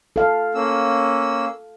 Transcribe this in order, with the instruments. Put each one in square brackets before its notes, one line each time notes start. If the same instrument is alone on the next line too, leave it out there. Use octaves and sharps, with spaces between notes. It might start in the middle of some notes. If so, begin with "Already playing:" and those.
[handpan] A4 F5
[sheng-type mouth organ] A#3 C#4 E6